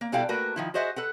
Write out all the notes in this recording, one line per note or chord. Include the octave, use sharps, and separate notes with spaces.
A#3
B2 G3 E4 A4 F5 G5
A3 A#3 F#4 A#4 B4
D#3 F3 E4
F#4 G#4 C5 D#5 E5 F#5
A4 B4 F#5